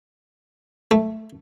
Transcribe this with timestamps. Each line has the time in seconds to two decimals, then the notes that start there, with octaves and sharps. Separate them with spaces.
0.91 A3